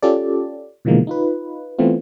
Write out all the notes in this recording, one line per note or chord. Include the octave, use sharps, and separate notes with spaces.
C#4 F4 G4 A4 D5
B2 D3 E3 F3 G#3 A#3
D#4 F4 B4
E3 A3 B3 C4 F4